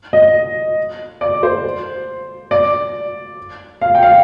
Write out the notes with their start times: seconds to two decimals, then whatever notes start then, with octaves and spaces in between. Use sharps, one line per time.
0.13 D#5
1.21 D5
1.43 C5
2.51 D5
3.81 F5
3.95 G5
4.03 F5